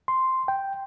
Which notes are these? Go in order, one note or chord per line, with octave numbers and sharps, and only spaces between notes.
C6
G5